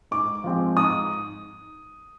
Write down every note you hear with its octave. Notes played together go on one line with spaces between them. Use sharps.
G#2 D6
F3 G#3 C4
G#2 D#6